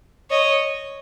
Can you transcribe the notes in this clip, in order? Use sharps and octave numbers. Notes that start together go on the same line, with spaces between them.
C#5 D#5